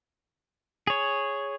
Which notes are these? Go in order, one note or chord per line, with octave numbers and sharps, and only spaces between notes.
G#4 C#5